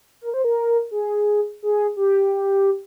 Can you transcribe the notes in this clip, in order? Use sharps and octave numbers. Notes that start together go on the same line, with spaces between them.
A#4
C5
A#4
G#4
G#4
G4